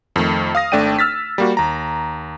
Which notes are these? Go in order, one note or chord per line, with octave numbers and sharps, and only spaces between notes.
F2 D#3 A3
F5 D#6 A#6
G#1 A3 D4 D5 G5 D#7
E6 F6 A6 B6
G3 A#3 F#4
D#2 A#5